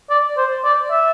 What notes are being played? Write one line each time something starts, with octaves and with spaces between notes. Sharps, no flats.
D5
C5
D5
E5